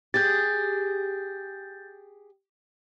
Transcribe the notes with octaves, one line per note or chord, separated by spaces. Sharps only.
G4 G#4 G6 A6